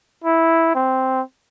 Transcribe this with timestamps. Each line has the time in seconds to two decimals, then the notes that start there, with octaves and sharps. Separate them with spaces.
0.24 E4
0.75 C4